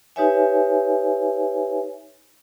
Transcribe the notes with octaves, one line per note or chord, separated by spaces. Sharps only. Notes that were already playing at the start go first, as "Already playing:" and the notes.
D#4 G4 B4 C#5 E5 G#5